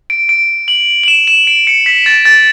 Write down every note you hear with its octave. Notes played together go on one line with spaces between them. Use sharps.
D7
D7
F#7
F#7
E7
E7
D7
C#7
B6
A6
A6